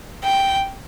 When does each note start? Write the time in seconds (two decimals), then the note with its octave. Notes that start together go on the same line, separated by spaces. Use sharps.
0.24 G5